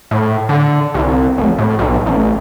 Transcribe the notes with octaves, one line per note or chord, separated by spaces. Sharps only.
A2
D3
C2
F1
A2
B1
A1